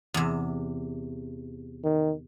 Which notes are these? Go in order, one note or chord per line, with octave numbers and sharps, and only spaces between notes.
E2 C3
D#3